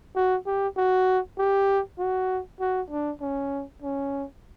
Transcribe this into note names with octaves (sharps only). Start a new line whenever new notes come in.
F#4
G4
F#4
G4
F#4
F#4
D4
C#4
C#4